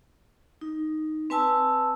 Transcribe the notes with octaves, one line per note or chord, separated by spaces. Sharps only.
D#4
C4 B4 G#5 A5 E6